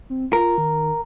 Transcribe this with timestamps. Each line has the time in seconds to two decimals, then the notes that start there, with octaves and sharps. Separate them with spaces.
0.10 C4
0.33 F4 A#4
0.58 D#3